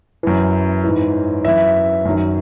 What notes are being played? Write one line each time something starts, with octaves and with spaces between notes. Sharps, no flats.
F#2 E3
G#2 E3
F#2 E3 E5
F#2 D#3 F#3